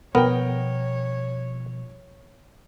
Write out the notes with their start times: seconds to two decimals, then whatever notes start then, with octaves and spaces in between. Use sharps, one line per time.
0.15 B2 F3 G3 B3 A#4 C#5 G5